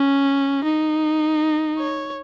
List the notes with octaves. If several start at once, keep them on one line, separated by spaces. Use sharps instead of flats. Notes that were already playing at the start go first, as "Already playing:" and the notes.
Already playing: C#4
D#4
C#5